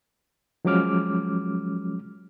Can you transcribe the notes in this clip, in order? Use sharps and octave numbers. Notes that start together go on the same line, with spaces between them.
F3 F#3 G#3 C#4 D6 F6